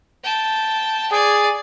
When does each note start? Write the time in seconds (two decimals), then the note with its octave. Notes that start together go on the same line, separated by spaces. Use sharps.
0.24 G5 A5
1.11 G#4 D5 G#5